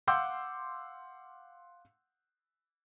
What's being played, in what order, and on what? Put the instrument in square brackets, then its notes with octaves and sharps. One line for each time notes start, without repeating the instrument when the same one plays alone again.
[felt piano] F5 F#5 C6 D6 E6 G6